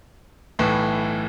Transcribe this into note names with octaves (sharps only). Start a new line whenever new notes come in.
B1 A2 E3